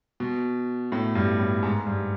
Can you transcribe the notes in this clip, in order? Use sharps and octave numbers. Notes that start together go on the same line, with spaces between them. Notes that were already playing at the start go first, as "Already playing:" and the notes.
B2
A2
G2
A2
G#2
G2